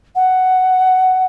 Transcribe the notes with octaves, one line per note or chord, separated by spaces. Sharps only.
F#5